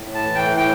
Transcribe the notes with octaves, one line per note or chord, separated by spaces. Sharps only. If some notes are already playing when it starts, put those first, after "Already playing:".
Already playing: A2
A5
E3
G5
A2 G5